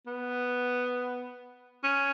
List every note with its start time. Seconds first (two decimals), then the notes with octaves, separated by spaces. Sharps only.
0.07 B3
1.84 C#4